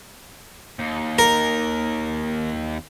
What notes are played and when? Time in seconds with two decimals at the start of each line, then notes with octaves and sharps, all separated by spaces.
0.79 D#2
1.19 A#4